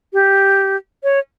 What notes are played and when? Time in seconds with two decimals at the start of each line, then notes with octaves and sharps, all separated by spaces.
0.13 G4
1.03 C#5